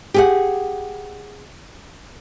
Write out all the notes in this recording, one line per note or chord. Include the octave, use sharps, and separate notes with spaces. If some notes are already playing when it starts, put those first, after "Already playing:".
G4 G#4 F#5